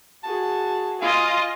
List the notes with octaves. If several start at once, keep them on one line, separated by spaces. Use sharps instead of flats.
F#4 G#4 A5
F4 D#5 F5 G#5